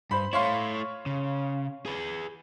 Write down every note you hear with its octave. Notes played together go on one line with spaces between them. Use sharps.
G2 C5 B5
A3 E4 C#5 F5 C6
C#3
G#4 B4